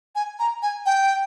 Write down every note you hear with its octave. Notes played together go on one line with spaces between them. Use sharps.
G#5
A#5
G#5
G5